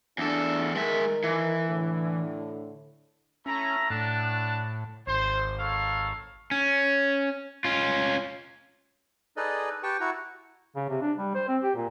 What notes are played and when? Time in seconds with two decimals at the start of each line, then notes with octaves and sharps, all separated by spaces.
0.18 E2 D4 A4
0.76 D#3 G#3 A#4 E5
1.24 E3
1.67 A2 D3
3.46 A3 C#4 E4 A#5
3.90 A2 D4 F#5 A5
5.07 G#1 C5
5.59 A4 C#5 F5
6.51 C#4
7.64 C#4 F4
9.37 D#4 G#4 A4 B4 D5 D#5
9.83 G4 B4 G5 A5 C#6
10.00 E4 F#4 F#5 A#5
10.76 C#3
10.89 C3
11.02 D4
11.18 G3
11.34 C5
11.48 C4
11.62 G4
11.75 A#2